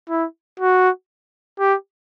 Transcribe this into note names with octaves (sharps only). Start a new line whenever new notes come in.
E4
F#4
G4